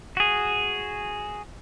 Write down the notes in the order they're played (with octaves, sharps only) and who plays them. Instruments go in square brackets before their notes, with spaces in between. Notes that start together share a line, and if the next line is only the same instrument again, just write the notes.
[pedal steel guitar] F#4 G#4